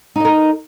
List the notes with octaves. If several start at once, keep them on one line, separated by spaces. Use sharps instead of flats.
D#4 A#4 D#5